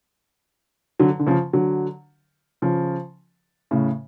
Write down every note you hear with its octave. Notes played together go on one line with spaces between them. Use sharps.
D3 F#3
D3
C#3 F3
D3 F#3
C#3 F3
A2 C#3